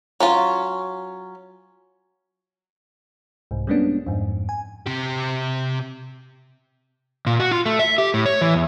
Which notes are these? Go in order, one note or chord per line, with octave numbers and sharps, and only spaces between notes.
F#3 C#4 F4
C2 G#2
G3 G#3 A#3 B3 C#4 D4
F2 G#2
G#5
C3 G4
A#2
F#4
F4
A3
E5
G4
A2
C#5
E3
E2